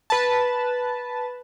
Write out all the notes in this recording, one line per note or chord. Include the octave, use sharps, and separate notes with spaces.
B4 A5